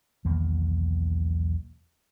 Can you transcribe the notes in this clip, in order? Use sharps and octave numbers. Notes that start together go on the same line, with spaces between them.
B1 E2 D#3 A#3